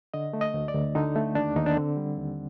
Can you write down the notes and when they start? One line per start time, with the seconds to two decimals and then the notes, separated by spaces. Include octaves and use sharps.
0.14 D3 D#5
0.33 A3
0.41 D#5
0.54 D2
0.68 D5
0.74 D2
0.95 D3 D#4
1.16 A3
1.35 D#2 D4
1.56 D#2 D#4
1.66 D4
1.76 D3 C4
1.97 G3
2.18 D#2